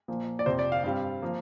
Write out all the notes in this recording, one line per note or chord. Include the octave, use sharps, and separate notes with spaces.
A#2 F3 A#3
D5
F2 C3 F3 C5
D5
F5
G2 G3 C4 F5
F3 A#3